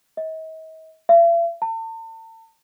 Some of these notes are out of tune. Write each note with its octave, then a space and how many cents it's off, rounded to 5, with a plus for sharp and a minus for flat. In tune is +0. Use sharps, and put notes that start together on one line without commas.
D#5 +45
E5 +45
A5 +40